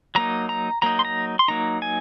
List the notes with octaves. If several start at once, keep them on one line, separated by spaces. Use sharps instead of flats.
F#3 A#3 D#4 A#5
A#5
F#3 A#3 D#4 A#5
C6
A#5
C6
F#3 A#3 D#4 A#5
G#5